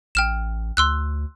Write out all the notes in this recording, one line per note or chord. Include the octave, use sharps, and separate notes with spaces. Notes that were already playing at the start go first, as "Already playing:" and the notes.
A1 G5 F6 E7
D2 C6 E6 F#6